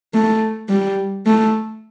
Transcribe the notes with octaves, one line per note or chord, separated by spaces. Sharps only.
A3
G3
A3